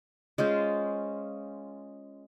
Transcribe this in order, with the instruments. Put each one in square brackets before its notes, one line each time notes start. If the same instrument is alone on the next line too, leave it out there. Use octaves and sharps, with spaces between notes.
[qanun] G#3 C#4 F4 C5